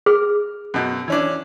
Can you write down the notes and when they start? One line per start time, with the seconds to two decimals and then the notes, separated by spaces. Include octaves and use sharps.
0.06 G#4 F6
0.74 F#2 B2
1.08 E3 C#4 D4